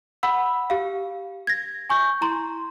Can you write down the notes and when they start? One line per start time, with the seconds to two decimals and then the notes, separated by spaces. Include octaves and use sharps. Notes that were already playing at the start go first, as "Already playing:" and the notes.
0.23 F#5 B5 E6
0.70 G4 F5
1.47 G#6 A#6
1.90 G#5 C#6 G6
2.21 E4 A#5 C6